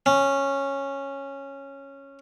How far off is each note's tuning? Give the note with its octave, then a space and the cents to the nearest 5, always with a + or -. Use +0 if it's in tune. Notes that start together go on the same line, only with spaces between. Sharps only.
C#4 -10